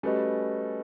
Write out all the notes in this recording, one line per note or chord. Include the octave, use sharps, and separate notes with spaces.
G3 A3 C#4 F#4 B4 D#5